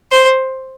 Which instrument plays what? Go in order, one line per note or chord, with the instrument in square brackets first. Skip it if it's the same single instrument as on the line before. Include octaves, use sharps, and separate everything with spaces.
[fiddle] C5